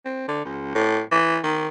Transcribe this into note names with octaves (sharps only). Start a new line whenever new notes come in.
C4
D3
C#2
A2
E3
D#3